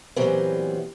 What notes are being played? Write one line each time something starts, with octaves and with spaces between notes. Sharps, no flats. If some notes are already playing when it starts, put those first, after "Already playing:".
A#2 E3 F#3 G3 B3 C4